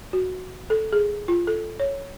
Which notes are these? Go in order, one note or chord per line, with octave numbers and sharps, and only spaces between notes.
F#4
A4
G#4
F4
A4
C#5